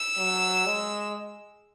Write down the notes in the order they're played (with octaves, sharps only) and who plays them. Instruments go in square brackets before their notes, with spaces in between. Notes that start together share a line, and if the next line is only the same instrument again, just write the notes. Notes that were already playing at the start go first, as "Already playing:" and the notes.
Already playing: [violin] E6
[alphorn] F#3
G#3